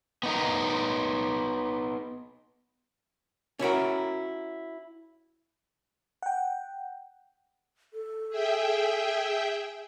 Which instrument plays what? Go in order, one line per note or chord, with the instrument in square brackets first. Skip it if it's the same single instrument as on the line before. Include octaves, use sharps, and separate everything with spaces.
[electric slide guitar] B3 D#4 A#4
[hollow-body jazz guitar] C#4 E4 F#4 A#4
[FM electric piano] F#5 G5
[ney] A4
[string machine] G#4 E5 G5